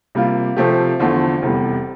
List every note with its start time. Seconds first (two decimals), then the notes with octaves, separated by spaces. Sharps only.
0.15 C3 G3 A#3 F4
0.56 C3 F3 A3 C4 G4
0.99 E2 D3 F3 A3 C4
1.42 F1 E2 C3 G3